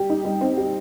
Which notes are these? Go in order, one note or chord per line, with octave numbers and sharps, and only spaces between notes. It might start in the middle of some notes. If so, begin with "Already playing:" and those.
Already playing: G3 G4
D#4
G3
C4
G4